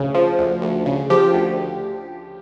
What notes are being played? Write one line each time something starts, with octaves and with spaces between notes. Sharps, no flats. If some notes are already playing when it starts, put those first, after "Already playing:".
Already playing: D2 C#3
F3
D2
D2
C#3
F3 G4
D2